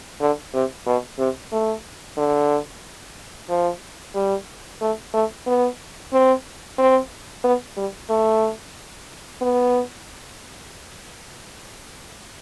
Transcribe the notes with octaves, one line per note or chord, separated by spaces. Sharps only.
D3
C3
B2
C3
A3
D3
F3
G3
A3
A3
B3
C4
C4
B3
G3
A3
B3